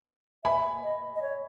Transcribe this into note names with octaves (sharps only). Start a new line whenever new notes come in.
E5 G#5 B5
D#5
D#5
C#5